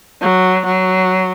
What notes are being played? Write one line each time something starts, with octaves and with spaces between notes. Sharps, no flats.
F#3
F#3